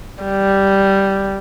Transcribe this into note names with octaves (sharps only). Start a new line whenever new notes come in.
G3